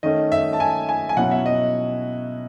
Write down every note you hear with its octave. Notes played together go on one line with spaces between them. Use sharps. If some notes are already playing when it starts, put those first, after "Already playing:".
D#3 A3 C#4 D#5
E5
A5
G#5
G#5
G#5
B2 F#3 C#4 E4 F#5
E5
D#5